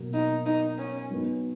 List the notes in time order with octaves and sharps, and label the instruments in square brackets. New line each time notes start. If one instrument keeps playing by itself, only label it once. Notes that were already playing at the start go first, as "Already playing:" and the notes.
Already playing: [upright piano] B2 F#3 A#3
[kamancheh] D#4
D#4
C#4
[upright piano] F#3 B3 D#4